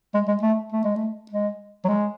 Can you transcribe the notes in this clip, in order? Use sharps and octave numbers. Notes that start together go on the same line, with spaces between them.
G#3
G#3
A3
A3
G#3
A3
G#3
F#3
G#3